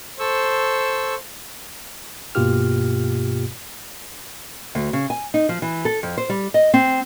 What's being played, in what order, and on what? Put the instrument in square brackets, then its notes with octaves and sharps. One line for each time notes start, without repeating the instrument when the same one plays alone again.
[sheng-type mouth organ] A4 C#6 E6 [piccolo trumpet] C5
[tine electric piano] G2 B2 A#3 F4 G4 F6
[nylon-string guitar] D2
C#3
G#5
D#4
F3
E3
A4
F2
C5
G3
D#5
C4